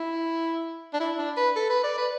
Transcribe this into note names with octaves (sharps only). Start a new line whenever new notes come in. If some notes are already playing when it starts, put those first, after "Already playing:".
Already playing: E4
D4
E4
D4
B4
A4
B4
D5
B4